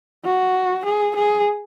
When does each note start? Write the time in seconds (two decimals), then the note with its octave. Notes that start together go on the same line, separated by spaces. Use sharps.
0.25 F#4
0.85 G#4
1.16 G#4